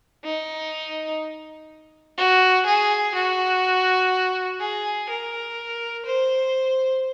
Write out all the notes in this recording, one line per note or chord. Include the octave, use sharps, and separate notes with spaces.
D#4
F#4
G#4
F#4
G#4
A#4
C5